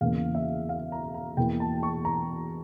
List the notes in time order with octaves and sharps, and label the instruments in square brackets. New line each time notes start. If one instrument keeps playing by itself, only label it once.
[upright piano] E2 C#3 E3 A#3 F5
E5
F5
A#5
A#5
E2 E3 A#3 G5
A5
C#6
A#5